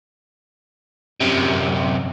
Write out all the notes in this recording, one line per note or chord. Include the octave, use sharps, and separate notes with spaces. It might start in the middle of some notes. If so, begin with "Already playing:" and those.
F#2 C3